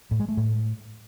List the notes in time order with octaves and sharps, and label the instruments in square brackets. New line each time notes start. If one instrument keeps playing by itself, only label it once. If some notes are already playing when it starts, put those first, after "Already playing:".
[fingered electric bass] A2
G#3
A3
A2